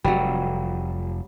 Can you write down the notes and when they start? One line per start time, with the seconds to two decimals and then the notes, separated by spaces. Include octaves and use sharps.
0.04 F1 F2 F#3 G3